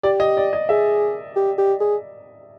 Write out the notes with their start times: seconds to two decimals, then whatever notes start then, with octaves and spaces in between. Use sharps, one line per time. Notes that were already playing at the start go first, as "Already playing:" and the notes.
0.03 G4 D5
0.20 D#5
0.37 D5
0.53 D#5
0.69 G#4 E5
1.36 G4
1.58 G4
1.80 G#4